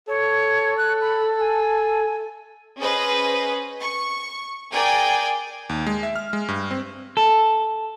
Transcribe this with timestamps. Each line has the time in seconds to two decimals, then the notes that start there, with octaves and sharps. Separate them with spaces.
0.08 A4 C#5
0.77 F#6
1.01 B5
1.39 G#5
2.79 C#4 G#4 B4 C5 D#5
3.79 C#6
4.72 G#4 A#4 D5 G5 G#5
5.69 D#2
5.87 G#3
6.03 E5
6.16 F6
6.33 G#3
6.48 G2
6.71 C4
7.17 A4